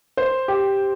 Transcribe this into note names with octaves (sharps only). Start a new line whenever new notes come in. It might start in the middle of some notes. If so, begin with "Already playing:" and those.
C5
G4